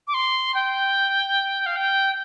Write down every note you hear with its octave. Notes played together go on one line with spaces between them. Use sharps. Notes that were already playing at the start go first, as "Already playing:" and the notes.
D6
C6
G5
F5
G5